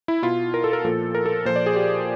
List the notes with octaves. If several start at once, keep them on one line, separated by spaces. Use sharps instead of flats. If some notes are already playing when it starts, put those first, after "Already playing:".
E4
B2 F4
A#4
A4
A#4
A#2 F3 A4
A#4
A4
A#2 F3 C5
D5
G#4
G4